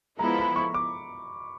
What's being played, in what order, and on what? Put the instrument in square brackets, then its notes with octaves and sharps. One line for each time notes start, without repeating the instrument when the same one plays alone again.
[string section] F3 G#3 B3 E4 A4 [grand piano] A#5
[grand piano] B5
C#6
D6